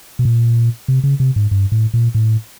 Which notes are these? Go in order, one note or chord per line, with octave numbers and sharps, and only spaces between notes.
B2
A#2
C3
C#3
C3
G#2
G2
A2
A#2
A2